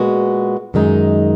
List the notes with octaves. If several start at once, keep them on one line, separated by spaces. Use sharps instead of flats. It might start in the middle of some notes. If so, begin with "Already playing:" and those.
Already playing: A#2 G#3 B3 F#4
F#2 D#3 G#3 D#4